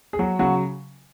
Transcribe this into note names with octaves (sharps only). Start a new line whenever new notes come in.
G#4
F#3 F#4
C#3 F#3 F#4